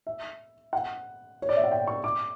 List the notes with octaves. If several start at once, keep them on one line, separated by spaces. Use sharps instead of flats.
E5
F#5
C#5
D5
E5
F#5
G5
C#6
D6